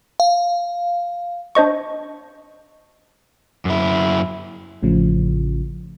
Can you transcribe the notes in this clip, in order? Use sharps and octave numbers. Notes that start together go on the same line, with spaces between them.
F5
D4 C5 D#5 C#6
F#2 E4
A1 A2 C#3 F3